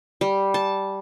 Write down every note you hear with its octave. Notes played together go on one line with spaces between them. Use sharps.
G3
A5